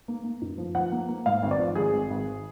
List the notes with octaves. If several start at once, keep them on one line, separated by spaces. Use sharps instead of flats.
A#3
A#3
F#2
F3
F3 F#5
A#3
A#3
G#2 F5
G#1
D5
F3
G#1 G#4
G#1
G#1